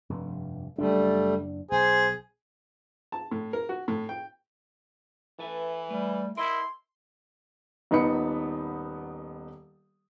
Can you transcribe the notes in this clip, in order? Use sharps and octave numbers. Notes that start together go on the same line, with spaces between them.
F1 G2
F#1 G3 A3 D4
B1 G#4 C5
A5
A2
A#4
F#4
A2
G5
E3 A4 B4 E5
G3 A3
E4 A#4 D#5 C6
D#1 D#3 B3 D#4 B5 C#7